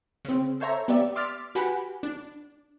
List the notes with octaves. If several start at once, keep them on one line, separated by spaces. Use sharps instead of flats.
C#3 C4
A4 C5 C#5 E5 A#5
B3 G4 D5 E5
C6 D6 E6 F6 A6 B6
F#4 G4 B4 F#5 G#5 B5
D4